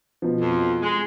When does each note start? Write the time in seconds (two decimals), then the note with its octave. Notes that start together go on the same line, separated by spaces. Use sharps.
0.22 B2 F3
0.41 F2
0.82 G#3